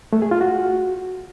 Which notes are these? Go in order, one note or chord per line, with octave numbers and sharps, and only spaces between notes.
A3
G#4
F4
F#4